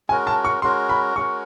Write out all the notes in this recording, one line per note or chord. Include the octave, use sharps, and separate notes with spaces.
G#3 C#4 F#4 A#4 G#5
A5
C#6
G#3 C#4 F#4 A#4 C6
B5
G#3 C#4 F#4 A#4 C#6